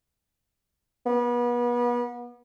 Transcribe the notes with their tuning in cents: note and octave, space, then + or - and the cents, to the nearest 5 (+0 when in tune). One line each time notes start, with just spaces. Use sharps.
B3 -35